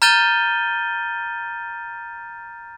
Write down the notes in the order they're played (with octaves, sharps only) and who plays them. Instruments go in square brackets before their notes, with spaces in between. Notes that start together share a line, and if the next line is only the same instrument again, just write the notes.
[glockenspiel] A#5 F6 G6 A6 D#7 G7